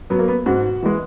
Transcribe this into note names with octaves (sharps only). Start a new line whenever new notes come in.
F#3 B3
A#3
B3
G#2 F#4
E3 G#3